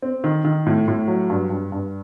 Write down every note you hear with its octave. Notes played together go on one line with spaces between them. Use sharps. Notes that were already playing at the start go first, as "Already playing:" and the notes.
C4
D#3
D#3
A2
A2
F#3
G2
G2
G2